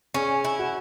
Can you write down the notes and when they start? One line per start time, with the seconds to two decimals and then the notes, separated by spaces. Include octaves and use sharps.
0.14 C#4 G#4
0.44 E4
0.59 F#4